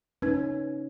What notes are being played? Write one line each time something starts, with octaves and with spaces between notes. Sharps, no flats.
C#4 D#4 B4